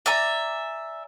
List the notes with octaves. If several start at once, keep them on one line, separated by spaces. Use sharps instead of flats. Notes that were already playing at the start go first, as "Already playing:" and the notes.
D5 E5 G#5 A#5